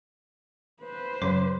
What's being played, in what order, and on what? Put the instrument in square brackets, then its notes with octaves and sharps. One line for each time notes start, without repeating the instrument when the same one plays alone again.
[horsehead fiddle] B4 C5
[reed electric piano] F#2 C#3 [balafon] F#3 C#5 C6